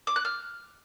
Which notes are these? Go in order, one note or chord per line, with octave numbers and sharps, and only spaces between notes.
D6
F#6
F6